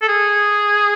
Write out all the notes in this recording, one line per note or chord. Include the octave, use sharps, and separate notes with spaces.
A4
G#4